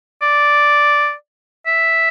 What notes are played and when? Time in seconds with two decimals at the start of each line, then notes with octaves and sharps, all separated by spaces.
0.22 D5
1.66 E5